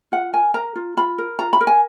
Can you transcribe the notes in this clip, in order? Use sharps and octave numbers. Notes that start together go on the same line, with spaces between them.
F4 F#5
A#4 G#5
A#4 A#5
F4
F4 B5
A#4
F4 A#5
B5
A#4
G#5